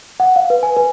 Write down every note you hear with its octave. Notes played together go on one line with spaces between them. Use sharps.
F#5
F5
B4
G#5
B4